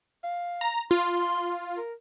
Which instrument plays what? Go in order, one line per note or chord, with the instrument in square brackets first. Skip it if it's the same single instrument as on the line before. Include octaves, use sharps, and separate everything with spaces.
[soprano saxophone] F5
[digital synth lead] A#5
[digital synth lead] F4 [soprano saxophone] C6
[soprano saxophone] A#4